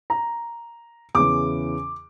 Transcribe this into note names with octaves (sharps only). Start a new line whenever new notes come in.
A#5
E2 C#3 E3 D6